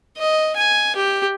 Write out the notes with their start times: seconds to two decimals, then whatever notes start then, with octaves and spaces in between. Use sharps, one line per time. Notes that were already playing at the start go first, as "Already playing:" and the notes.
0.18 D#5
0.56 G#5
0.96 G4